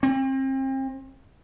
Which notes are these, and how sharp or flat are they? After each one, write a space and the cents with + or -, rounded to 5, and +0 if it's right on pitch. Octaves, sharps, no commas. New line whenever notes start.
C4 +35